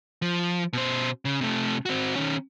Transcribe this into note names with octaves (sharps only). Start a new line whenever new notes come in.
F3
B2 C5
C#3
C3 A3
C4 F#4
D#3 C#4